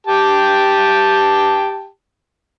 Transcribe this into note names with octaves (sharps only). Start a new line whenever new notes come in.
G4 G5 A5